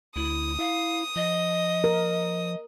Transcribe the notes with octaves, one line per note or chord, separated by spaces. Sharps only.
D2 E4 D#6
E4 F5
F3 D#5
A#4